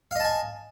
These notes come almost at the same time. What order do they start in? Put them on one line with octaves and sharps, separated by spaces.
F5 D#5 A5 G#5